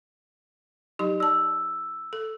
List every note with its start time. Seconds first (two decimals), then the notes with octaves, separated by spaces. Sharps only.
0.99 F#3 D#4 G4
1.20 D5 A5 E6
2.13 A4